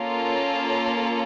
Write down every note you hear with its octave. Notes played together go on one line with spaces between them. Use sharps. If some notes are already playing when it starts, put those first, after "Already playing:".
Already playing: A#3 C#4 F4 A4